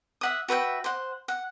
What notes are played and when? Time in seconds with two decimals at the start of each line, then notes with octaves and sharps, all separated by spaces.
0.21 E5 F#5 D#6
0.48 F#4 B4 E5 G5
0.84 C5 F#5
1.28 F#5